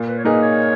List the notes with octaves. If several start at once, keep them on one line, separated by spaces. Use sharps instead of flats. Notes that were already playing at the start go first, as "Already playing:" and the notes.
Already playing: A#2
B4
C#5
A#3 D#4 G#4 B4
C#5